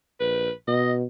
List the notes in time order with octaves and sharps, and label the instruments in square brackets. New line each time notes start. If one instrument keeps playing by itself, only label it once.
[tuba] A#1 [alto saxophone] B4
[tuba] B2 [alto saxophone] D#5